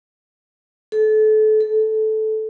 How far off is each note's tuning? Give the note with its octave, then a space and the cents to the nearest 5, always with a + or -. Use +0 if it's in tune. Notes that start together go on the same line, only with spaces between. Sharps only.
A4 -30
A4 -15